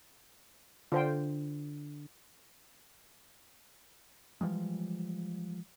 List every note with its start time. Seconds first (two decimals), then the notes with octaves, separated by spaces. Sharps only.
0.92 D3 F4 C5 G5
4.41 E3 F3 G3 G#3